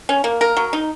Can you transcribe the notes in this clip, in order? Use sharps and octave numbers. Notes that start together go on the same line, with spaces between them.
C#4
A#3
A#4
F#3
D#4